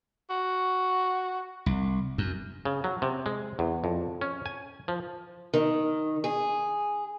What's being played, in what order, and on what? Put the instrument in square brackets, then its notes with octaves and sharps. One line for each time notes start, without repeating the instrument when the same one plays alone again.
[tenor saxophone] F#4
[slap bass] C2
F#2
[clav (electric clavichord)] C#3
F#3
C3
G#3
E2
F2
C#4
G#5
F3
[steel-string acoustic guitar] D#3
G#4